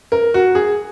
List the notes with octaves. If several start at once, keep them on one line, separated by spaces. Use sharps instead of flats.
A#4
F#4
G#4